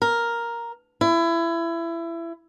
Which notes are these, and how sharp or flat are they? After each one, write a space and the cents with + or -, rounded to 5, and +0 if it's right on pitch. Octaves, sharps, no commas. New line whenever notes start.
A#4 +5
E4 +25